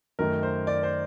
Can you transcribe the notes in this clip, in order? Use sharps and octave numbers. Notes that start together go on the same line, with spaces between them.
F#2 D#3 A3 A#4
C5
D5
C5